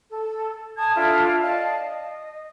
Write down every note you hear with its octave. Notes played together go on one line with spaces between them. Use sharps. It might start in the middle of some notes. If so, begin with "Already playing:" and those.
A4
G#5 A5 D#6 G#6
D4 E4 F4 A4
D5 D#5 F5 A5
D#5